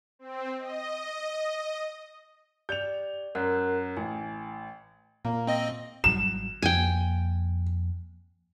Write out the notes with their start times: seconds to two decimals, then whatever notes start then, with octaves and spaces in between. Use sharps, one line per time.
0.19 C4
0.59 D#5
2.69 G4 D5 G6 F7
3.35 F#2 A#4 F#5 F#6
3.97 A1 G#5
5.25 A#2 A#3
5.47 C4 D#5
6.04 G#1 F#3 G3 E7
6.62 F2 F3 A#3 G5 G#5